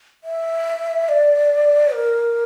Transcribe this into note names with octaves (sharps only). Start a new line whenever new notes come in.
E5
D5
A#4